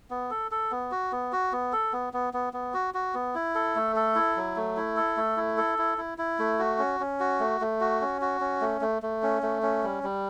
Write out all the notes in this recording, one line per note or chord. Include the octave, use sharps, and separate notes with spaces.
B3
A4
A4
B3
F#4
B3
F#4
B3
A4
B3
B3
B3
B3
F#4
F#4
B3
E4
A4
A3
A4
E4
F#3
A3
E4
A4
A3
E4
A4
E4
E4
E4
A3
F#4
C#4
C#4
F#4
A3
A3
F#4
C#4
F#4
C#4
A3
A3
A3
C#4
A3
C#4
G3
G3